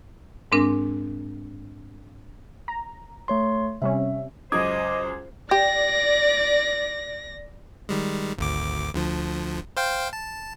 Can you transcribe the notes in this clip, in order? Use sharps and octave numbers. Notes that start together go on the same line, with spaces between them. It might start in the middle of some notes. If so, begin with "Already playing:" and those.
G#2 G#3 C4 D4 A#4
A#5
A3 C#5 C6
C3 G3 C#4 E5
C#2 F#2 C5 D#5 D6 D#6 G#6
G4 D5 A#6
D#3 G3 G#3
G#1 D2 D6
D2 D3 F3
C5 F5 G5
A5